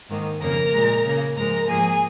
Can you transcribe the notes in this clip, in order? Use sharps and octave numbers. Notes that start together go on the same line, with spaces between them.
G#2 D#3 A#3
F2 C#3 A#3 A#4 A#5
A#2 G#3
C#3 A#3
G#2 F3 G#3 A#4 A#5
G#2 F3 A#3 G#4 G#5